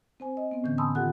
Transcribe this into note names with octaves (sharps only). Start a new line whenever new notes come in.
C4 C5 G#5
D#5
B3 C4
A2 D3 E3 C#4 G6
G#5 A5 B5 C6 D#6 E6
D#3 F4 G4 A4 F#5 F#6